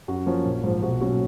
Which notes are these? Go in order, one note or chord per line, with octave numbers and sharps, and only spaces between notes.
F#2 F#4
F3 A#3 C#4
A#1
G#2 F3
B1 F#4
A#2 F#3 C#4